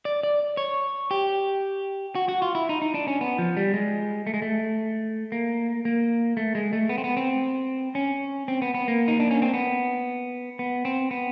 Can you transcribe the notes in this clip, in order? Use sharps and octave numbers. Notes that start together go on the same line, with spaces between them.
D5
D5
C#5
G4
F#4
F#4
F4
E4
D#4
D#4
D4
C#4
B3
F3
G3
G#3
A3
G#3
A3
A#3
A#3
A3
G#3
A3
B3
C4
B3
C4
C#4
C4
B3
B3
A#3
D#4
D4
C#4
C4
B3
B3
C4
B3